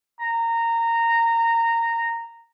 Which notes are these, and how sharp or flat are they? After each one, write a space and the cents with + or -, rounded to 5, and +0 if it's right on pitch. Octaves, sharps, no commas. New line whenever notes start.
A#5 -15